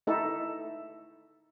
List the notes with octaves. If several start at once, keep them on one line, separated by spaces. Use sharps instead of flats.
A3 D#4 E4 A4